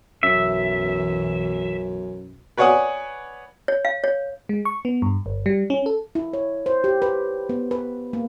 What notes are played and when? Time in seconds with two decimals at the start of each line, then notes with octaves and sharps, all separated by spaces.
0.23 B1 F#2 E3 E5
2.57 B4 C#5 D5 F#5 G#5 D#6
3.68 C#5
3.85 F5
4.04 C#5
4.49 G#3
4.65 C#6
4.85 B3
5.02 G2
5.26 G1
5.46 G3
5.70 C#4
5.86 A4
6.15 E4
6.33 C#5
6.66 C5
6.84 G4
7.02 B4
7.49 B3
7.71 B4
8.13 A#3